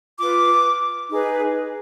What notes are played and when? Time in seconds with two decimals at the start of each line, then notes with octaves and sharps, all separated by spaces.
0.18 F4 B4 D6
1.10 D#4 G#4 B4